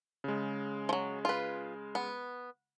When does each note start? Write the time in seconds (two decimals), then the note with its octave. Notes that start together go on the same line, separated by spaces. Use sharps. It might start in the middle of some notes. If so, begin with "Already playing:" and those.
0.24 C#3 G#3
0.89 F3 F#3
1.25 F4 B4
1.95 B3